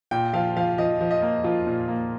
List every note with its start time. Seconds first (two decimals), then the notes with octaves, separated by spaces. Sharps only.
0.11 A#2 G5
0.34 F3 F5
0.57 F3 F5
0.78 F3 D#5
1.01 F3
1.11 D#5
1.22 A#3
1.44 F3 F4
1.67 A#2
1.88 A#3